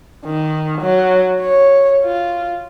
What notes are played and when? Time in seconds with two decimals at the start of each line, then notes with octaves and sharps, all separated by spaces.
0.26 D#3
0.81 F#3
1.41 C#5
2.05 F4